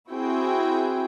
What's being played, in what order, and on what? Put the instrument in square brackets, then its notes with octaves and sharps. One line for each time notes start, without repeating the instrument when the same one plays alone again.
[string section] C4 E4 F#4 G#4 G5